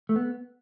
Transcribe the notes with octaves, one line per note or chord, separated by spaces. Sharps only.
A3
B3